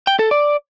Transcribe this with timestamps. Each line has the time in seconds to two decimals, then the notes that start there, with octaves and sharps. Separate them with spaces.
0.07 G5
0.19 A4
0.31 D5